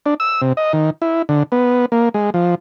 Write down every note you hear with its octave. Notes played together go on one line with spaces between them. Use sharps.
D4
E6
C3
D#5
D#3
E4
D3
B3
A#3
G#3
F3